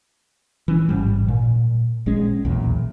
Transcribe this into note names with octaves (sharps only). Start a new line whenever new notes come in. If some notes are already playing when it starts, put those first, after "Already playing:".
E3 C#4
A1 G#2 G3
A#2
A#1 G#3 C#4
B1 E2 A#2